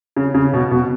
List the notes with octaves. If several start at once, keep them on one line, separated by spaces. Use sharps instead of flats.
C#3
C#3
B2
B2